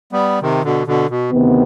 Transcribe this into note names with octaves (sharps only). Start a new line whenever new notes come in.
G3 B3
C3 D#3
B2 D3
B2 D3
B2
D2 C3 D#3 B3